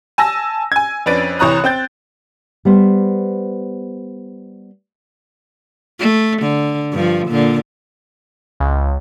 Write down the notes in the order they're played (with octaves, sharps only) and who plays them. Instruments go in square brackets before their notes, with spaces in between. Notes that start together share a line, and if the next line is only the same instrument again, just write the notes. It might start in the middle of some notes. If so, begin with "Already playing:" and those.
[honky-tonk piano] G#5 A5 E6 A#6
G#5 G#6
F2 C#4 D4 B4 A6 D7
C2 E3 C#5 A#5 D#6 F#6
C4 G5 G6 A6
[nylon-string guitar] G3 B3 C5
[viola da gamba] A3
D3
G2 F3
A#2 D3
[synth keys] C#2